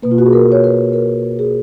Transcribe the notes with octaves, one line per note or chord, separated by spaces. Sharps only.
B2 A#3 B4
F4
F#4
G#4
A#4
C#5
B4
A#4
G#4